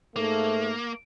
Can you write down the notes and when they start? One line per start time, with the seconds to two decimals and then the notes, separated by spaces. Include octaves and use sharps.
0.16 G#2 A3 A#3